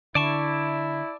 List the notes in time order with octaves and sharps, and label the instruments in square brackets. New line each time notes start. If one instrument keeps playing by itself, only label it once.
[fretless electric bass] D3 [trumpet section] E4 [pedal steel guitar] D5 A5 C#6